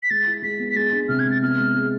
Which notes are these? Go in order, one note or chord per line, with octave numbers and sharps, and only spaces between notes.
B6
G#3 A6
E4
G#3 B6
B3
B6
G#3 A6
D4
C3 F6
G#6
G#3 A6
B3 F6
G#3
G#3